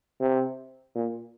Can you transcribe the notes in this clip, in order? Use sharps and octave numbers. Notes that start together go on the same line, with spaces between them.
C3
A#2